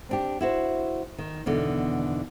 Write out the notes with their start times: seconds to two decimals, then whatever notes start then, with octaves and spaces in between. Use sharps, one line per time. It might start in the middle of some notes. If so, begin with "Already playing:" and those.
0.09 C4 D4 G4
0.41 E4 F#4 C5
1.18 D#3
1.46 E2 B2 D3 D#3